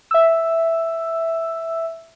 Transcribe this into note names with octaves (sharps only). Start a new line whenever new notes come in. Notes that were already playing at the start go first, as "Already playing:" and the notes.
E5 E6